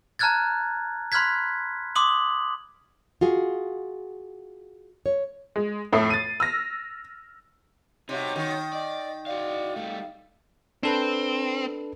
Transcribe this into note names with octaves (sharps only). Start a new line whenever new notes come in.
A5 A#5 F6 F#6 G#6 A6
B5 C6 F6 F#6 G#6 B6
C6 D6 D#6 F#7
F4 F#4 G#4
C#5
G#3
F2 A2 E5 D#6 C7
A6 D#7
E6 F6 A#6
C3 D#4 F#4 C#5
D#3
D5 D#5
F#4 D5 F5
G3 A3 F5
C4 D4 A4 B4